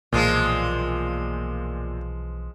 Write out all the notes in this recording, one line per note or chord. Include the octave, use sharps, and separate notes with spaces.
B1 A#2 E3 F3 G#3 F4